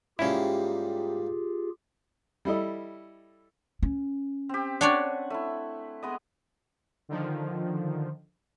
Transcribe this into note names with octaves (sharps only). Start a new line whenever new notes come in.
G#2 G3 A#3 C#4 E4 F4 G4 G#4
G3 E4 A4 D#5
C#4
C4 G4
D4 C#5 D5 F#5 G#5
A3 E4
G#3 B3 D#5
D3 D#3 F3